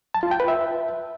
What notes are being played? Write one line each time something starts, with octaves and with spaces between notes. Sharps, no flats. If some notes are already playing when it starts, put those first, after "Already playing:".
A5
F4
G5
B4
E5